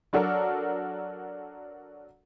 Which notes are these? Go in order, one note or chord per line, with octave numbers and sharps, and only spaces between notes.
F#3 D4 F#4 A4 A#4